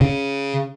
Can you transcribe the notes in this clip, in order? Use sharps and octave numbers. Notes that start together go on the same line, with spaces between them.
C#3